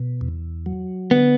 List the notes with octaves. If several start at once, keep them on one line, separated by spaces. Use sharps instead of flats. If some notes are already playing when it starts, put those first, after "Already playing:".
Already playing: B2
E2
F#3
D3 B3